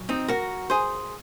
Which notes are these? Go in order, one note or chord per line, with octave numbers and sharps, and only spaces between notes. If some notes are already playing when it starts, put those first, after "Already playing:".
Already playing: A#2 F#3
C4 D#4
F#4 A#4
G#4 C5